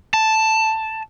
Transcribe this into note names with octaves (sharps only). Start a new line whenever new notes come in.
A5